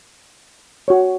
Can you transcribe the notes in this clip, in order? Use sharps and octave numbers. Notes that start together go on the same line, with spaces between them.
F#4 C#5